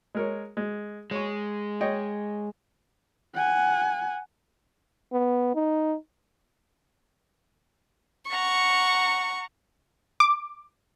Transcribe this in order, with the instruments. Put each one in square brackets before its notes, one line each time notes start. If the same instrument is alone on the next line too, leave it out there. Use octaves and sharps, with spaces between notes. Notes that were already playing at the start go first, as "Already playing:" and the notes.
[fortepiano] G#3 A#4 C#5
G#3
[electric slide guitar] G#3 [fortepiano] C#5 C#6
[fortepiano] C#5 D#5 G5
[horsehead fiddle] F#5 G#5
[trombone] B3
D#4
[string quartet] F#5 A#5 [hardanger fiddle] C#6
[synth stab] D6